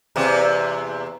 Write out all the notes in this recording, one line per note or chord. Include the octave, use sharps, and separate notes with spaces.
E2 C3 A#3